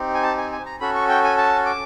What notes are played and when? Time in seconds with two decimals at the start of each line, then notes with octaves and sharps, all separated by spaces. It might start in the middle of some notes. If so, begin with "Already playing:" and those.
Already playing: C4 D#4 G4
0.14 G#5
0.23 A5
0.37 G#5
0.52 G#5
0.66 A#5
0.80 C#4 F#4 A4 B5
0.95 C#6
1.09 G5
1.24 G#5
1.38 A5
1.66 D6